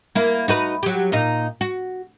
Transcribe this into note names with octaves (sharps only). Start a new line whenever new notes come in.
A#3 E4
D#4 F#4 B4
F#3 G4
A#2 D#4
F#4